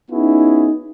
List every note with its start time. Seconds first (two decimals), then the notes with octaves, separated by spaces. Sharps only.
0.11 B3 C#4 D#4 E4 F#4 G#4